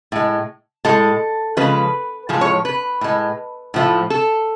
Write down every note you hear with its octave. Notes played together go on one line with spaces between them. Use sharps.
A2 G#3
A2 G#3 A4
C#3 F3 G#3 B4
A2 F3 G#3 G#4
C#5
B4
A2 G#3
A2 F3 A3
A4